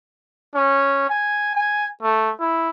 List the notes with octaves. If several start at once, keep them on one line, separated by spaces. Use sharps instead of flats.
C#4
G#5
G#5
A3
E4